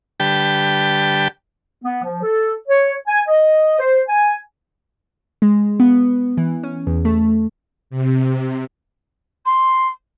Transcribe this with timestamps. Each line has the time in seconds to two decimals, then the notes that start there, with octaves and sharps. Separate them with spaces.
0.20 D3 G3 G4 B4 G5 A5
1.83 B3
2.03 F3
2.23 A4
2.68 C#5
3.08 G#5
3.28 D#5
3.79 C5
4.08 G#5
5.42 G#3
5.80 B3
6.37 E3
6.63 C#4
6.87 E2
7.05 A3
7.90 C3
9.45 C6